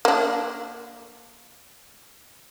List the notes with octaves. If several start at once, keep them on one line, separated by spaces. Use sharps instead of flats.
A#3 D4